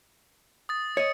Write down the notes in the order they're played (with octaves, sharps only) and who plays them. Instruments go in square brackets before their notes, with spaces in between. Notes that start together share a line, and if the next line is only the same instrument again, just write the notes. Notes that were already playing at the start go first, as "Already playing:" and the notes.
[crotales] D#6 A6
[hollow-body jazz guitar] C#5 D#5 [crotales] C#7